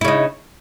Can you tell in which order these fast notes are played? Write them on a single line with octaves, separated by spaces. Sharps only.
E4 C#3 D#4